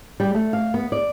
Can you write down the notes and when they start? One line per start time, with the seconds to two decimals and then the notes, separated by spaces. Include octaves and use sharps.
0.20 G3
0.34 A3
0.53 F5
0.74 B3
0.92 D5